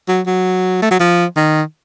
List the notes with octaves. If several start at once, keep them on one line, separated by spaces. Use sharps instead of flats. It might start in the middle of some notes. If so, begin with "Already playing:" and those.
F#3
F#3
A3
F#3
F3
D#3